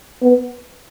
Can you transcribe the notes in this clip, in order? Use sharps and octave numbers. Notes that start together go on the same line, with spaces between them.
B3